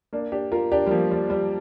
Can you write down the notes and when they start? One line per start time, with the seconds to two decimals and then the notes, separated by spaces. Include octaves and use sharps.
0.13 A#3 D4
0.32 D4 G4
0.52 F4 A#4
0.72 D4 G4
0.87 G3
0.91 F3 A#3
1.11 G3
1.30 G3